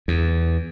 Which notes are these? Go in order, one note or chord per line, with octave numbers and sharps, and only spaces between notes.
E2